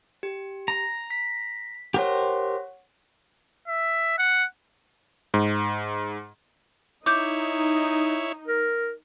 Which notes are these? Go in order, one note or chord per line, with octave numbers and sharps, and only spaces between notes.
G4
A#5
B6
G4 A#4 C5 C#5 F#5
E5
F#5
G#2
D#4 E4 C#5 D6 G6
A#4